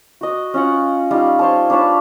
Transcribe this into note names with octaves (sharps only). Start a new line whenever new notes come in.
F#4 D#5
C#4 F4 F#5
G3 D#4 F4
C5 C#5 A5
D4 B4 C#5 A5